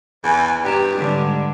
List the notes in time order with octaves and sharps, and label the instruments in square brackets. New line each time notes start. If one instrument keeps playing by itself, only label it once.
[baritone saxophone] E2 [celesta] G#4 G#5
[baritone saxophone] G2 [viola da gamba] G4 [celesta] G5 A#5 E7
[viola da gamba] G#2 D3 G3